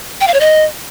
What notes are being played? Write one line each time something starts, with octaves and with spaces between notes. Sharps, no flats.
G5
F5
C#5
D#5